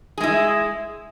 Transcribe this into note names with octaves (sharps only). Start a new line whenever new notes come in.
G#3 E4 G#4